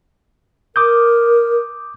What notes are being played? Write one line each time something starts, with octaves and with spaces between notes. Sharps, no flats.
A#4 D6 D#6 G6